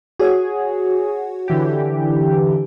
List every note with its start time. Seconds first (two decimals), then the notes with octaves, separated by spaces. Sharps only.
0.20 F#4 G#4 C#5 F#5
1.48 D3 E3 G4